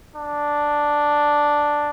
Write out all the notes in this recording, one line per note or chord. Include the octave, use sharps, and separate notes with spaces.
D4